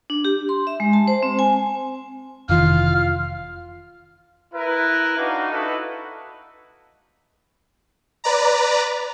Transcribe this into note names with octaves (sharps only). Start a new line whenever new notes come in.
D4
G4
C6
E5
G#3
A5
C5
C4
G#5
F1 D#3 E3 F4 F5 F6
E4 A#4 B4
D4 D#4 F#4 F5
D#4 E4 F#4 A4 B4
B4 D5 A#5